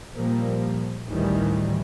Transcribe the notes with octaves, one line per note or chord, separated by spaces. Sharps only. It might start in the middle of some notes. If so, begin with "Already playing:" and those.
A#2 F3 G3 A#3
A1 D2 A2 D#3 E3 G3